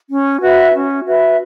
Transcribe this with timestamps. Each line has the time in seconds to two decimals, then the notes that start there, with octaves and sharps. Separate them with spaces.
0.09 C#4
0.41 F#4 B4 E5
0.73 C#4
1.05 F#4 B4 E5